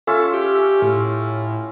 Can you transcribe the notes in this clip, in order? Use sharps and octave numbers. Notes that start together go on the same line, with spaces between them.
C#4 F4 A4 E5
G4
A2